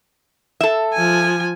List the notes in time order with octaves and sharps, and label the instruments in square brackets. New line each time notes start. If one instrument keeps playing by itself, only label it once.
[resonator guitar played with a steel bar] A4 E5
[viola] F3 G#5